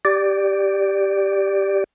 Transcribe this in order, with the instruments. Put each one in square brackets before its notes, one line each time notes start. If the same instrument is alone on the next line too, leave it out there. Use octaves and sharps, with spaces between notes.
[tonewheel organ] G4 D5